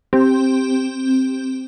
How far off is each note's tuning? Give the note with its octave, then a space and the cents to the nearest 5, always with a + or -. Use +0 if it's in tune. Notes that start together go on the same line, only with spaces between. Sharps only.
C4 +5 G4 +0